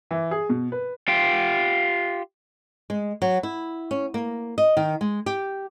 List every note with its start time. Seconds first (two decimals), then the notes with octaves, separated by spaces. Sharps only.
0.11 E3
0.31 G#4
0.49 B2
0.72 B4
1.08 F4 G4
2.90 G#3
3.22 F#3
3.43 E4
3.91 C#4
4.14 A#3
4.58 D#5
4.77 D#3
5.01 G#3
5.26 G4